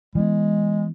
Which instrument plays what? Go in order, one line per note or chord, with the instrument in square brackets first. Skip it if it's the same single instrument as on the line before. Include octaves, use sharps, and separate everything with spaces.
[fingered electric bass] E3 B3 [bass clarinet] G#3